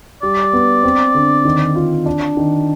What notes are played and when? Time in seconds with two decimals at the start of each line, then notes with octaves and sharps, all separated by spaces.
0.22 G3 D5
0.53 B3
0.83 C4
1.15 D3
1.45 D#3
1.75 F4
2.06 D4
2.37 D#3